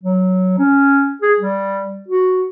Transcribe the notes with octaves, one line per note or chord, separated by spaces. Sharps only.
F#3
C#4
G#4
G3
F#4